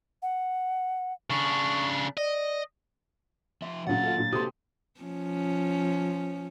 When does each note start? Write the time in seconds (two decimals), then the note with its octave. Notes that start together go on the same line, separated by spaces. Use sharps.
0.22 F#5
1.30 C#3 D4 C#6
2.17 D5 D#5
3.62 F3 E5 C6
3.87 D#2 A#2 C#3 F#3 A#3 F#5 A6
4.03 F4 A4
4.18 A#2
4.32 C3 A#3 C4 F#4 G4 A4 C6 D#6
5.01 F3 C#4